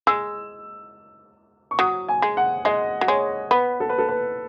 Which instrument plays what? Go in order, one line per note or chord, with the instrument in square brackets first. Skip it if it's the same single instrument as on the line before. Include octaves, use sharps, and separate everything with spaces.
[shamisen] G#3 [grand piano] E6
[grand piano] C#6
[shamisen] F#3 [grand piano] D#6
[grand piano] G#5
[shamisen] G#3
[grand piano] F#5
[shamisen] G#3 [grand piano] D#5
[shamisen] F#3
[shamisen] G#3 [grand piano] C#5
[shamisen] B3 [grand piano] B4
[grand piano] A4
B4
A4
B4